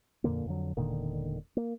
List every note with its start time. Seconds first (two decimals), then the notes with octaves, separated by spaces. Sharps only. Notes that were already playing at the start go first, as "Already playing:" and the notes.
0.24 F2 A#2 D3 A#3
0.46 F2 D3 F#3
0.77 E1 A#2 D3 D#3
1.57 A#3